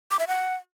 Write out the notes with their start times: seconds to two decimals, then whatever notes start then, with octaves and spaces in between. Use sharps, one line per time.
0.11 D6
0.19 E5
0.28 F#5